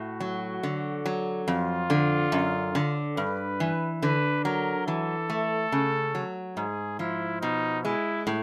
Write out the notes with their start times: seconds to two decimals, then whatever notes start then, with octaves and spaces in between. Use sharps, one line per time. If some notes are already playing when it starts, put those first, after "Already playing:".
Already playing: A2 F#4
0.20 F#3
0.63 D3
1.06 F#3
1.47 F2 F4
1.90 D3
2.32 F#2
2.75 D3
3.17 G2 B4
3.60 E3
4.02 D3 B4
4.45 F#3 A#4
4.87 E3 A4
5.30 A3
5.72 C#3
6.15 F#3
6.57 G#2 G#4
6.99 F3 E4
7.41 B2 D#4
7.85 G#3 E4
8.27 A2